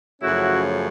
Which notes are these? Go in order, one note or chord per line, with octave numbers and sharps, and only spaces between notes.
F#2 C#3 F3 A3 C#4 E4 F#4